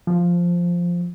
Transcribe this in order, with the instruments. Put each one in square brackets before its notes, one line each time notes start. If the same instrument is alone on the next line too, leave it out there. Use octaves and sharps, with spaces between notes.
[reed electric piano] F3